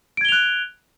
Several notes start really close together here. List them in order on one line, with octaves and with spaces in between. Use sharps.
D7 G#6 G7 F7 F#6